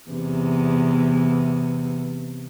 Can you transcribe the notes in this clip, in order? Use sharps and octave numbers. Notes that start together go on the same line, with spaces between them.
E2 C3